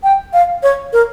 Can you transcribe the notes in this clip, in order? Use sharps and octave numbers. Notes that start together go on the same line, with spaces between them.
G5
F5
C#5
A#4